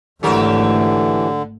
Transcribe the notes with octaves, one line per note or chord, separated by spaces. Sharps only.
G#1 D3 E3 F#3 A3 G4 A#4